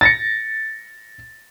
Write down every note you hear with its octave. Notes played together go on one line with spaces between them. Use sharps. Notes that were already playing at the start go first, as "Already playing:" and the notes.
A6 A#6 C#7